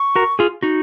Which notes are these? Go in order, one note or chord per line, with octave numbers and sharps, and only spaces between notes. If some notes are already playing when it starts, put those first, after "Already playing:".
Already playing: C#6
F#4 A#4
F4 G#4
D#4 F#4